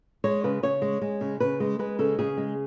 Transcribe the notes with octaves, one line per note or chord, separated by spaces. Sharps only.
G#3 C#5
C#3 B4
C#3 C#5
G#3
G#3
C#3
C#3 B4
G#3
G#3 B4
C#3 A4
C#3 G#4
G#3